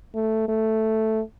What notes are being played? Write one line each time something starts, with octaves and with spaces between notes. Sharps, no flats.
A3
A3